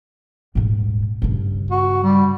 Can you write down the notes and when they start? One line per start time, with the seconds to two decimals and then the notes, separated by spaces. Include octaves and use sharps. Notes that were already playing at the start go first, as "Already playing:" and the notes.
0.55 D#1 G#2
1.22 G2 C#3
1.71 F#4
2.04 G3